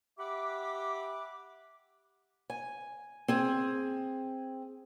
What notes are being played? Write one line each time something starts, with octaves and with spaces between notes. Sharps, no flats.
G4 E5 F#5 B5 D6
G#5
C4 G#4